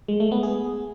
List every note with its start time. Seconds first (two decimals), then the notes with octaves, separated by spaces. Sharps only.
0.08 G#3
0.20 A3
0.32 B3
0.43 G#4